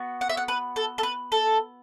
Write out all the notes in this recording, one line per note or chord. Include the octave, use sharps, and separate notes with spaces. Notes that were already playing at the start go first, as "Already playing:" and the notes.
Already playing: B3 F#4
F#5
E5
F#5
B4
A4
A4
B4
A4